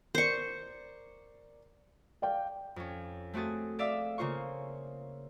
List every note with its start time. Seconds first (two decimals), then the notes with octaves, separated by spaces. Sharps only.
0.15 A#4 C5 D5 C#6
2.22 D5 F5 G5
2.76 F2 C#4
3.34 A3 C4 F#4 G#4 A6
3.79 D5 E5 F5 D6 E6
4.18 C#3 A#3 F4 C5 C#6